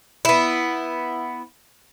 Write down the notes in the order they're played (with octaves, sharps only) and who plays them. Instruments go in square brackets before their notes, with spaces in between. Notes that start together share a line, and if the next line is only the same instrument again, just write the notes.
[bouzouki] B3 E4